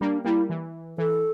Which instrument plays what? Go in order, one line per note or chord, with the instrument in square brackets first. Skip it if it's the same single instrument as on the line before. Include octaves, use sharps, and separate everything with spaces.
[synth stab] G3 A#3 [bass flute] D4
[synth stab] G3 A#3 [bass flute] E4
[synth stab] E3
[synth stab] E3 [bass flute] A4